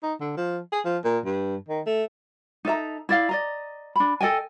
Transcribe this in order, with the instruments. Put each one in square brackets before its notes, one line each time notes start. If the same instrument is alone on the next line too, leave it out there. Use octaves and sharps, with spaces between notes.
[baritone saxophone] D#4
D3
F3
G#4
F3
A#2
G2
D#3
A3
[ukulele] D#4 A4 E5 A#5
E4 D5 F5
D5 D#5 A#5
D4 B5
A4 D#5 G5 G#5